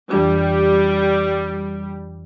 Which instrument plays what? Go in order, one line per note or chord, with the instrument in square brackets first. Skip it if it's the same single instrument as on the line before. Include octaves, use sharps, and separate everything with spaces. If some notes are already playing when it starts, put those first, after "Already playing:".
[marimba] F2 E3 D4 [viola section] G3